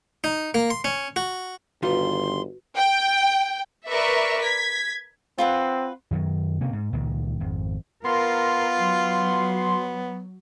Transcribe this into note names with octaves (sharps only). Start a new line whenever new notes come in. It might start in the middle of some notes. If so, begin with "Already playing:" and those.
D#4
A#3
C6
C#4
F#4
G1 D#3 G3 F4 F#4 B4 C6
G5
A#4 B4 D5 E5 C#6
G#6 B6
C4 F4 B4 F#5
F#2 D#3 F#3
C3 A#3 C4 C#4
G#2
C#2 A#2 D#3
G#1 F2
B3 F4 A#4 C6
F#3